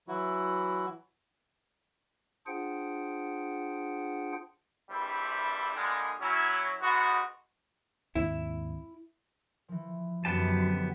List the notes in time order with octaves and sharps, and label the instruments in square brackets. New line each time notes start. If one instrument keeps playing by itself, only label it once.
[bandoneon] E3 F#3 E4 F#4
[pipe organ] D4 F4 G#4 C5 F#5 G5
[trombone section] A#1 G2 E3 G3 E4 C5
A#2 D3 F3 G3 G#3
F#3 C#4 E4
G#2 B3 D#4 F#4
[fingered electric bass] D#2 G#2 C4 [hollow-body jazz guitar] E4
[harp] E3 F3
[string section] F#2 [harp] D3 C5 [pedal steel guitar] B3 G4 A5